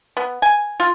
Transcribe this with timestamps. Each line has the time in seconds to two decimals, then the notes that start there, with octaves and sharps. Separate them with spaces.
0.17 B3
0.42 G#5
0.80 F4